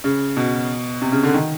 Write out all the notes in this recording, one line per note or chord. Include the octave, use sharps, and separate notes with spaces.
C#3
B2
C3
C#3
D3
D#3